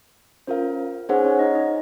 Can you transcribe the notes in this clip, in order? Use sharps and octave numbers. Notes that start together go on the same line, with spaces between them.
C#4 F4 A#4 C5 F5
C#4 D#4 G#4 C5 C#5 F#5
C#4 C#5
D#4 D#5
D#4 D#5